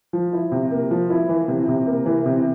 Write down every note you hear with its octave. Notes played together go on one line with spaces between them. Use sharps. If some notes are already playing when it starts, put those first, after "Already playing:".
F3
E4
C3
A#3
F3
E4
E3
C3
C3
A#3
E3
C3